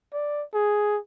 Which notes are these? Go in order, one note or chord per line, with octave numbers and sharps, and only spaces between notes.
D5
G#4